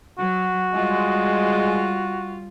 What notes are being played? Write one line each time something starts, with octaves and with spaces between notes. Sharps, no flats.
F#3 F#4
G3 G#3 F4